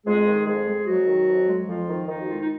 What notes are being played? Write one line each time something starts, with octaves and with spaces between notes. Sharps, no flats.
F2 G#3 G#4
D#3
F2 G#3 G#4
G#3
F2 F#3 F#4
D#3
F2
G#3
F2 F3 F4
D#3
F2 D#3 D#4
F#4
G#3 F4
D#4